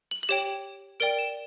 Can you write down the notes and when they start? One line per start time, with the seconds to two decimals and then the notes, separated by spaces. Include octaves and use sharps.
0.11 F#7
0.23 F#7
0.29 G4 C#5 G5 E7
1.00 A#4 D5 G5 D7
1.18 E7